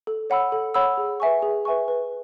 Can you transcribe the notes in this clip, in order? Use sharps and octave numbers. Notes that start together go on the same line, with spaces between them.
A4
C#5 F#5 B5 E6
A4
C#5 F#5 B5 E6
G#4
B4 E5 G#5 C#6
G#4
B4 E5 G#5 C#6
B4